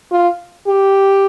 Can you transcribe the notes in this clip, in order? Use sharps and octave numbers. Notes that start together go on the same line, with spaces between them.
F4
G4